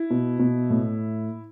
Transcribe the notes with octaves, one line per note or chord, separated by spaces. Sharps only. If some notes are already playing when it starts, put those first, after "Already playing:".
Already playing: E4
B2
B2
A2